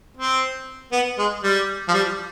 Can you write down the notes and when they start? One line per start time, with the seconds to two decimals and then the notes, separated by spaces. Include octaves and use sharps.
0.17 C4
0.92 B3
1.18 G#3
1.43 G3
1.88 F3
1.93 G3